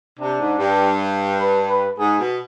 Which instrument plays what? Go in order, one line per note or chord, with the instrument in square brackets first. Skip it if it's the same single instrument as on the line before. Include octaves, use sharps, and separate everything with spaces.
[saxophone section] C3 [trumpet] D4
[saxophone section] G#2
G2
[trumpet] B4
B4
[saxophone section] G#2 [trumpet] G#4
[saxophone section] B2